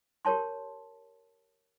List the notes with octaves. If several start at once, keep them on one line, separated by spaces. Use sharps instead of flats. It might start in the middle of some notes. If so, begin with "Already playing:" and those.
G4 A#4 C#5 A5 C6